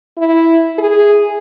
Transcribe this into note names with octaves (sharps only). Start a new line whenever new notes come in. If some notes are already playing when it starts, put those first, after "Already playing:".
E4
G#4